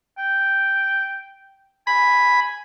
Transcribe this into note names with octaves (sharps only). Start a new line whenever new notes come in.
G5
G#5 B5